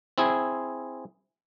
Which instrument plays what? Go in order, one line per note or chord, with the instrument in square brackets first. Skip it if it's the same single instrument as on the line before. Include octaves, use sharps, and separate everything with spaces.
[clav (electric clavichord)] C4 E4 G#4